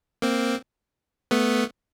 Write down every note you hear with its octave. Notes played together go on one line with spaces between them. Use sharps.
A#3 C4
A3 B3